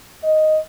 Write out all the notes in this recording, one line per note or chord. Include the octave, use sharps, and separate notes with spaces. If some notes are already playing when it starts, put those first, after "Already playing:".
D#5